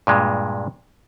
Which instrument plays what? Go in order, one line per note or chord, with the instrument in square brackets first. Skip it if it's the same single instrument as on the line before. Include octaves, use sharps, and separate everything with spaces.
[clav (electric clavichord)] G2 A#2 G#3